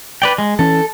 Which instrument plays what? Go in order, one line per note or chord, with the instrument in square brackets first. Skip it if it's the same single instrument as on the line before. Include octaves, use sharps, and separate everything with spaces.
[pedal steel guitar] B4 D5 G5
G#3
[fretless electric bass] E3 C#4 [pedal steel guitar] A4